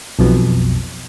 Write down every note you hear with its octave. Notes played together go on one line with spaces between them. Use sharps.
B1 F2 B2